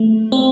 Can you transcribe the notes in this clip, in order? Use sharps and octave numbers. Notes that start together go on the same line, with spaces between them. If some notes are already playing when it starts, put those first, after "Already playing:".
Already playing: A3
C4